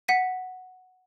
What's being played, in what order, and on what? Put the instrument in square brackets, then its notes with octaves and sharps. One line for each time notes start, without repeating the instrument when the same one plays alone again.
[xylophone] F#5 B6 D#7